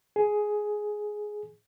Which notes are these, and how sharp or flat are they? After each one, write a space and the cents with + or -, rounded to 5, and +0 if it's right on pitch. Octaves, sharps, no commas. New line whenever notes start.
G#4 +10